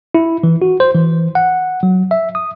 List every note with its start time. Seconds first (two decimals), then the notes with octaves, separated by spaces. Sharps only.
0.15 E4
0.44 E3
0.62 F#4
0.80 C5
0.95 E3
1.35 F#5
1.83 F#3
2.11 E5
2.35 D#6